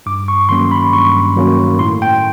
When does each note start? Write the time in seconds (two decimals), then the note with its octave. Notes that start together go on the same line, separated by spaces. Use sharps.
0.06 G2 D6
0.28 C#6
0.49 D#3 F#3 A#3 C#4 C6
0.71 B5
0.93 G2 C#6
1.36 D#3 F#3 A#3 C#4
1.79 A2 C6
2.02 G5